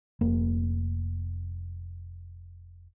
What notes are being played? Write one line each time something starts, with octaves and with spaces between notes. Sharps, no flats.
F1 A#3